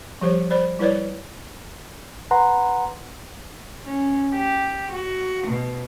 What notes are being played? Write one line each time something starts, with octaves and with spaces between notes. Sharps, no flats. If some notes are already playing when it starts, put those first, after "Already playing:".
F3 G3 G4 C5 C#5
C5 D5 B5
G3 E4 B4 C#5 D5
B4 F#5 A#5 C6
C#4
G4
F#4
B2